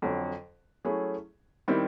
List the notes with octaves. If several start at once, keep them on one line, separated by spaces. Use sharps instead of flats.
F2 D3 F#3
F#3 A3 C#4 E4 G#4
D#3 G3 C4 E4 G4